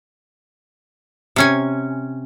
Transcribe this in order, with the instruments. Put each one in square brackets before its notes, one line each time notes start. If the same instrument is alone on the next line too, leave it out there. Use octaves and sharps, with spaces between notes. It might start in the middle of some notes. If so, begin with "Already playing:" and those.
[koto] C3 C#4 G#5